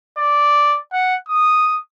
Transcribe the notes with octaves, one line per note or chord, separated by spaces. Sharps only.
D5
F#5
D#6